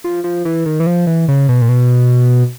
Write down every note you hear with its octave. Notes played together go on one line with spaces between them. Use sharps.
F3
F3
E3
D#3
E3
F3
E3
C#3
B2
A#2
B2